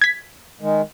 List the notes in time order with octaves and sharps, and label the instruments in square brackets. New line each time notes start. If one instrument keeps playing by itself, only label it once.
[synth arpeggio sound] G#6 B6
[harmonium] D#3 G#3